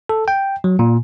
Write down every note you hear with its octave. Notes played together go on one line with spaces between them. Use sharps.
A4
G5
F#3
A#2